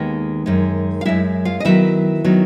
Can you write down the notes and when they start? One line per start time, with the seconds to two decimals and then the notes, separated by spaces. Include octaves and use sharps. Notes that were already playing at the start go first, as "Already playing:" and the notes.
Already playing: D#2 D#3 G#3 B3 D#4
0.46 F#2 D#3 G#3
1.01 F5
1.05 F#2 D#3 G#3 E4 E5
1.45 F4 F5
1.60 D#5
1.65 D#3 F#3 B3 E4 E5
2.24 D#3 F#3 B3